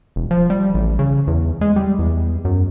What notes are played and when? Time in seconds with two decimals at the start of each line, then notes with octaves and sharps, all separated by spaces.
0.16 E1
0.31 F3
0.50 G3
0.74 A1
0.99 C#3
1.27 E2
1.61 G#3
1.76 G3
1.99 E2
2.45 F#2